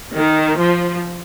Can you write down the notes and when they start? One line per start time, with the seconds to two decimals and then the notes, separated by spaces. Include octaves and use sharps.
0.16 D#3
0.58 F3